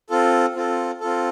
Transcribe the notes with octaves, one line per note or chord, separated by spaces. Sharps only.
C4 F4 A4
C4 F4 A4
C4 F4 A4